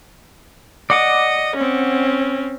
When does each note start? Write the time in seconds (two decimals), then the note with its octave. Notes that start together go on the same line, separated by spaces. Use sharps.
0.90 D5 D#5 F#5 D6
1.56 C4 C#4